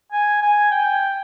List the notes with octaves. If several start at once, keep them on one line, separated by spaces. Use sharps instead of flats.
G#5
G#5
G5